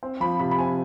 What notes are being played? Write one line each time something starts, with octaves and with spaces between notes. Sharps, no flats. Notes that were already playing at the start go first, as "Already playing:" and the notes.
C4
F3 B5
C3 B5
B5
C4 G#5